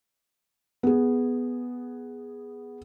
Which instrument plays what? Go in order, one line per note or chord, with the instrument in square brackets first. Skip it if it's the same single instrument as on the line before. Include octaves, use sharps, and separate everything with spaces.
[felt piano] B3 G#4